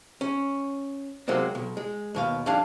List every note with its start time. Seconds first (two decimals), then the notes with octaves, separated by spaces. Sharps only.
0.21 C#4
1.28 C3 F#3 G#3 A#3 C4
1.55 B1
1.77 G#3
2.15 D#2 B2 F5
2.46 F2 F3 G3 D4 F5 G#5